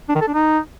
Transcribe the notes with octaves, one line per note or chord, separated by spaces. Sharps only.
D4
D#3
A4
D4
D#4